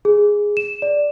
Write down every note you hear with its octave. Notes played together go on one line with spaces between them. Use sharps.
G#4
E7
D5